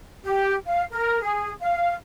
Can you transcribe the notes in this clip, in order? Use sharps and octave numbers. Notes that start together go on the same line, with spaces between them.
G4
F5
A#4
G#4
F5